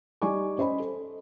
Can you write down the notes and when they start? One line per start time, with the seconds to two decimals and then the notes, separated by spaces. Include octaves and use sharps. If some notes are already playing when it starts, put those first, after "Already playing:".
0.22 G3 D#4 D5 G#5 C#6 D6
0.58 C#4 C5 D#5 B5
0.80 A4